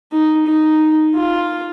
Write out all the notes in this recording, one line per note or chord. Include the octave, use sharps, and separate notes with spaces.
D#4
D#4
F4